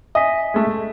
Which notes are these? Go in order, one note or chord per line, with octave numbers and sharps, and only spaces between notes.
D#5 E5 G#5 B6
G#3 A3